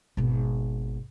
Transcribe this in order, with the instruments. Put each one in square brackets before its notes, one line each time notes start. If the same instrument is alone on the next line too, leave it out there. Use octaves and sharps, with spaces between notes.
[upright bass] G#1 B2